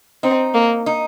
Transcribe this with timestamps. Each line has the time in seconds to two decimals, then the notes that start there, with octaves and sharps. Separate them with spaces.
0.23 C4 D#4
0.54 A#3
0.86 D#4